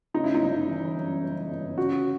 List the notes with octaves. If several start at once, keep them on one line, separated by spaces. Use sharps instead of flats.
C#3 D#4
E4
D#4
G1
E3
F#2
C#3
G1
C#3 F#4